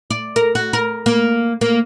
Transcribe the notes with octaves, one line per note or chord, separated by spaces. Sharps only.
D5
A#4
F#4
A#4
A#3
A#3